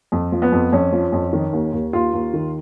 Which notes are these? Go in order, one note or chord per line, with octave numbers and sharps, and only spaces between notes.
F2
F3
B3
F2
F2 C#4
F3
F2
D#3
D#2
D#2
D#2 F4
D#2
D#3